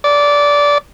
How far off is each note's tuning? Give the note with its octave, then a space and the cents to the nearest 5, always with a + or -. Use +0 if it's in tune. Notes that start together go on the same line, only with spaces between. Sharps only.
D5 -15